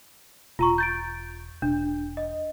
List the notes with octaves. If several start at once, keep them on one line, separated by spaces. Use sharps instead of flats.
E1 F4 A#5 C#6
G6 A6 D7
E1 D4
D#5